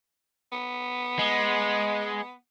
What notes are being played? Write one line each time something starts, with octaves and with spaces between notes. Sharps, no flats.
B3
G#3